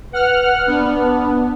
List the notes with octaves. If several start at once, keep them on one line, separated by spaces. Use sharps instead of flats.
B4 F#5 F6
B3 D4